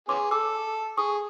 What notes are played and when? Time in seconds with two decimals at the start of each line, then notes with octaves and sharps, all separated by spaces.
0.09 B3 C#4 G#4 C6 D6
0.31 A4 D6 E6
0.97 G#4 C#6 D#6